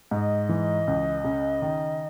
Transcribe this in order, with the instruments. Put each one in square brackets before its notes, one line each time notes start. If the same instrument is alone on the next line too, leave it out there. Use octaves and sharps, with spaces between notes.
[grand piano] G#2 [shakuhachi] D#5
[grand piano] E3
C#2
C#3
D#3